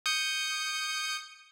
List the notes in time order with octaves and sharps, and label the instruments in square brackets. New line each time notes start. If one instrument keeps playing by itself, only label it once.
[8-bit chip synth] D#6 G6 C#7